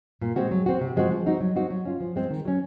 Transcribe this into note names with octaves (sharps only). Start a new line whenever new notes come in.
A#2
G#3 C4 F#4
F#3
C4 F#4
C3
F3 G#3 C4 F#4
F3
C4 D#4 F#4
F#3
C4 D#4 F#4
F#3
C#4 F4
F3
G#3 C4
D#3
F#3 C#4